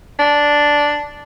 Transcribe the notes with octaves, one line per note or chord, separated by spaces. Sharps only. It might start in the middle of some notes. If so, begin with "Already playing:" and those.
D4